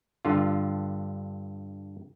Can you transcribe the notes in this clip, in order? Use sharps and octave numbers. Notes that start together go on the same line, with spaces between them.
G2 D3 F4